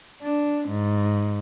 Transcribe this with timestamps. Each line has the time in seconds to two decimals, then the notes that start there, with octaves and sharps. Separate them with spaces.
0.22 D4
0.68 G#2